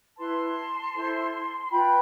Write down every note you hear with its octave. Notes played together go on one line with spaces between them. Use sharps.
E4 B4 A5 C6
E4 A4 C5
C6
F4 B4 G5 B5